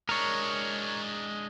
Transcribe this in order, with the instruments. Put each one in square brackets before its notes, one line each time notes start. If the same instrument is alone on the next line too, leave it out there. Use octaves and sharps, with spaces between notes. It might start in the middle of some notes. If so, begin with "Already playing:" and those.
[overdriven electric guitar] G#3 D4 [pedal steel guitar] A#4 C#5